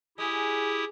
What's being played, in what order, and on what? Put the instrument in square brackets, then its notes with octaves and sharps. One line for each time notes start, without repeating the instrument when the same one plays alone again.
[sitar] G#3 [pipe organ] E4 G4 D#6